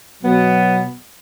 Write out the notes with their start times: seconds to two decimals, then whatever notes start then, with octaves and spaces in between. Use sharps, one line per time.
0.23 B2 F#3 B3